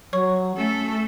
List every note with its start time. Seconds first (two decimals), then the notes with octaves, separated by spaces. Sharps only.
0.13 F#3 C#5 C#6
0.57 A3 C#4 A4